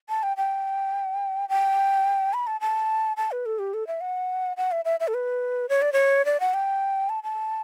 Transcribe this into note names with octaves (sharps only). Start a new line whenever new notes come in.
A5
G5
G5
G5
B5
A5
A5
A5
B4
A4
G4
A4
E5
F#5
F#5
E5
E5
E5
A4
B4
C#5
D5
C#5
D5
F#5
G5
A5
A5